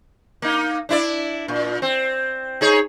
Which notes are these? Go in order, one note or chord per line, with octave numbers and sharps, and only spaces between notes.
A#3 D#4
D4 E4 D5
A#2
C4
D#4 G#4 C#5